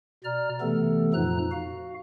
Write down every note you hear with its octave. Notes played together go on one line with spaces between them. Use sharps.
B2 D5 A#5 F6
C3 E3 A3 B3 A4
F2 A#2 F3 D#4 A#5 F#6
F#4 F5